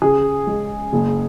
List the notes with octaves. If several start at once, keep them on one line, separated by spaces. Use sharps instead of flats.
C#3 G#4
G#3
F#1